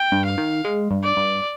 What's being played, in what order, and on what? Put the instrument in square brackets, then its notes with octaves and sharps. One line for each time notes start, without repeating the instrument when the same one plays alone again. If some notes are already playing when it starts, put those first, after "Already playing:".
Already playing: [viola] G5
[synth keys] G2
[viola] F5
[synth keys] D#3
G#3
G2
[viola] D5
[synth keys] G2